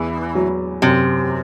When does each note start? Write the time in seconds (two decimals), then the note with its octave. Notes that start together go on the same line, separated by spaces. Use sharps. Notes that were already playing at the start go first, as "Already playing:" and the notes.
Already playing: E2 E3
0.35 F#3
0.82 F#2 C3